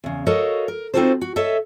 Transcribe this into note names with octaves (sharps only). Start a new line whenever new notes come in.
E2 C#3
F#4 A4 A#4 C#5 D#5 F5
A#4
C4 D#4 F4 F#4 A4 C5
F#4
A4 C#5 D#5 E5